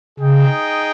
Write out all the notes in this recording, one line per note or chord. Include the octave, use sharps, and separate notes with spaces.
C#3 D#4 G#4 D#5 G5